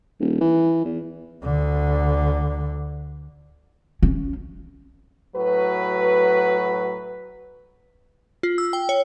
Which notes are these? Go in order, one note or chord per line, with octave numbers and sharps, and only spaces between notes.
D#1
E3
E2
D2 D3
C#4
A2 F#3 F#4 B4
F4
E6
G5
C#5